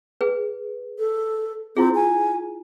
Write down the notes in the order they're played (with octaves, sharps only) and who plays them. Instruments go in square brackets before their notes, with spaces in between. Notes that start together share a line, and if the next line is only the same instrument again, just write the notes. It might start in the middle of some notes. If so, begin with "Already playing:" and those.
[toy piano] G#4 B4
[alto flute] A4
[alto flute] C4 [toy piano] E4 F4 G#4
[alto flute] G#5